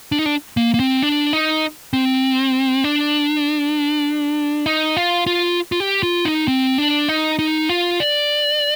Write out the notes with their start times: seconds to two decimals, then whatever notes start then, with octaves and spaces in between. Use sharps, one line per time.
0.12 D4
0.19 D#4
0.26 D4
0.57 A#3
0.74 A#3
0.80 C4
1.02 D4
1.33 D#4
1.93 C4
2.84 D4
4.66 D#4
4.97 F4
5.27 F4
5.72 F4
5.80 G4
6.03 F4
6.25 D#4
6.48 C4
6.78 D4
7.09 D#4
7.39 D#4
7.69 F4
8.00 D5